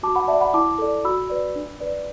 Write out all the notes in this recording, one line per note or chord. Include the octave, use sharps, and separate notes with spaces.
F#4 A5 D6
F#5 B5
D5 E5 A5
F#5 B5
E4 A5 D6
A4 D5
F#4 B5 E6
B4 D5
D4
B4 D5